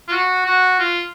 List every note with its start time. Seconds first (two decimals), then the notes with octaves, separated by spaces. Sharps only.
0.08 F4
0.11 F#4
0.46 F#4
0.80 F4